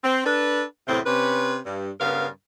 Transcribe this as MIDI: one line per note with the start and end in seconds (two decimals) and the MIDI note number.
0.04 0.21 60
0.25 0.63 62
0.25 0.63 69
0.25 0.63 71
0.88 1.00 40
0.88 1.00 45
0.88 1.00 48
0.88 1.00 60
1.06 1.57 48
1.06 1.57 61
1.06 1.57 71
1.66 1.90 43
2.00 2.27 43
2.00 2.27 49
2.00 2.27 59
2.00 2.27 70
2.00 2.27 77